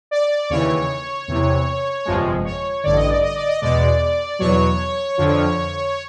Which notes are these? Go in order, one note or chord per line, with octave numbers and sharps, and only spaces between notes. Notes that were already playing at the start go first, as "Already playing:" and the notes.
D5
D#2 C#3 E3 C#5
E2 C3 E3
G1 F2 C3 F3 G#3
C#5
A1 G2 D3 D5
D#5
D5
D#5
D5
D#5
E2 B2 G#3 D5
E2 B2 F#3 C#5
F2 D3 F3